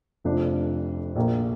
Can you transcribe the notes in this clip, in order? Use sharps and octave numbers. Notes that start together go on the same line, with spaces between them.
F1 F2 F3 D4
A#1 A#2 A#3